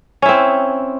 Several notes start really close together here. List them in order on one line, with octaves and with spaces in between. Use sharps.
C#4 E4 C4